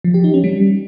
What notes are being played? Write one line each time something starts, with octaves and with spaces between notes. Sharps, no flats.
F3
G4
D#4
C#4
G3